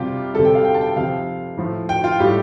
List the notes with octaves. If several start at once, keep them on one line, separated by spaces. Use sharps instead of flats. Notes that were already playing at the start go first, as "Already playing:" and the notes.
Already playing: C3 G3 F4 G4
C3 G3 A4
G5
F5
G5
A5
G5
C3 F3 F5
A2 F3
G5
F4
A2 G3 G4